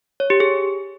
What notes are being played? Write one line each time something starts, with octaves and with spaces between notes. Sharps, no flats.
C#5
G4
G#4